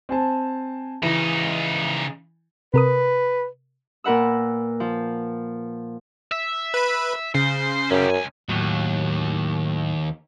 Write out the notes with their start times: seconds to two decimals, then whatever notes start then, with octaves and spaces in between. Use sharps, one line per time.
0.09 C4 G#5 A5
1.03 C#3 E3 D#4 E4
2.74 C3 A#4 B4 D#6
4.04 A#2 A#4 B4 F#5 E6
4.80 F3
6.32 E5
6.74 B4 B5
7.35 C#3 C5
7.90 F#2 C#4 G4
8.10 C#2 G#5
8.49 D#2 A2 F#3